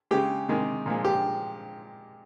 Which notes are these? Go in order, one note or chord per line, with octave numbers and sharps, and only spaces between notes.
C#3 G#3 G4
C3 D#3 G#3
A#2 F3 G#3
G4